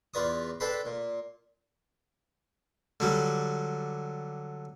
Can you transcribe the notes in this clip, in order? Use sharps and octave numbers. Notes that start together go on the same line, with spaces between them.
E2 F4 B4 D5 C#6 D#6
D4 A4 B4 G5 B5 C6
A#2
D3 F#3 G3